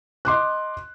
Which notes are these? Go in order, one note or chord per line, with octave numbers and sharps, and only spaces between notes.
D#5 C6 D6 F#6